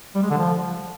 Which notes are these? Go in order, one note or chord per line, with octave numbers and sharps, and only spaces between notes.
G3
G#3
D3
F3